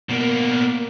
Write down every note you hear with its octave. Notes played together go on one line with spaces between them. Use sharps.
B2 A#3